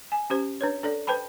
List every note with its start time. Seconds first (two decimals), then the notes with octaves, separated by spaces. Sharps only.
0.12 G#5
0.30 C#4 G4 C5
0.61 D4 B4 C#5
0.83 D4 A4 D5
1.07 B4 C5 G5 A5 B5